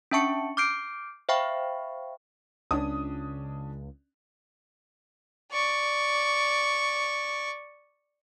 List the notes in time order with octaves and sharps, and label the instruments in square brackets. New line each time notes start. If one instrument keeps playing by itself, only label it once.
[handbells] C#4 D4 E5 A5 C#6 C#7
D6 F6 G6 C7 D7
C5 E5 F5 G5 B5 C#6
[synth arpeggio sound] C#2 [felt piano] C#4 D4 D#6
[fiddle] D5 C#6